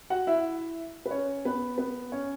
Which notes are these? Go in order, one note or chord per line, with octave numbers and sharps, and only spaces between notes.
F#4 F#5
E4 E5
B4
C#4 C#5
B3 B4
B3 B4
C#4 C#5